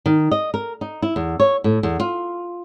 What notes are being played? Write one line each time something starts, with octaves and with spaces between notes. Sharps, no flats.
D#3
D#5
A#4
D#4
E4
E2
C#5
A2
E2
F4